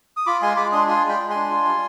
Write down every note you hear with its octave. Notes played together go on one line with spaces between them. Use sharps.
D#6
F4 B5 D6
G#3 G#5 C6
G#3 B5 D6
D4 C6 D#6
F4 G#5 C6
G#3 G5 B5
G#3
G#5 C6
D4
F4
G3